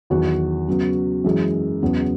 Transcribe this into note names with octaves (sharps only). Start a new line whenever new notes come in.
E2 D#3 F#3 F#4
C#3 F#3 B3
F#2 E3 G#3
E2 C#3 F#3 B3